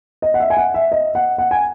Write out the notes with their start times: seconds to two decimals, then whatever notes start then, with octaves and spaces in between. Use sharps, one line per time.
0.22 D#5
0.34 F#5
0.40 E5
0.50 G#5
0.57 F#5
0.74 E5
0.92 D#5
1.15 F#5
1.38 F#5
1.51 G#5